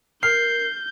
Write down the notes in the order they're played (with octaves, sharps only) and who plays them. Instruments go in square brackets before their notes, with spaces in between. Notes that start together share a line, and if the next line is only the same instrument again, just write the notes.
[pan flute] A#4 [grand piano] F6 [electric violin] G6 [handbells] C7